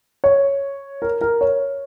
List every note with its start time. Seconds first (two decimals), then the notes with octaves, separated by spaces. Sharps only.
0.24 C#5
1.02 A#4
1.21 A#4
1.41 C#5